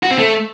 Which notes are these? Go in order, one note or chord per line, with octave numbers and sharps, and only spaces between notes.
F#4
C4
A3